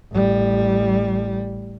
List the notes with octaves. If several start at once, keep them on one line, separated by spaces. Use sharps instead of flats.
A1 G3